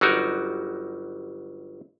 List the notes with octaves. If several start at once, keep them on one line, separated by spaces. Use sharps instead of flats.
G1 F#3 G3 D#4 F#4 A#4